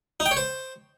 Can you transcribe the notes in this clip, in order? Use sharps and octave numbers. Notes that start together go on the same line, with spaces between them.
D#4
G5
C#5
C5